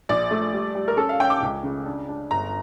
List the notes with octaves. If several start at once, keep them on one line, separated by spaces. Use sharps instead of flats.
A#1 D5
A3
G3
G3
A#4
C#4 A4
F5
C#4 G5
D6
C#2
C#3
D4
D4
G1 A#5